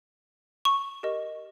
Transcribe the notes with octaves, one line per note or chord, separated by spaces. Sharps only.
C#6
G4 A#4 D#5